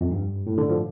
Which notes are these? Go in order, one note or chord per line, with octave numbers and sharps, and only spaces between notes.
F2
G2
A2
D3
F3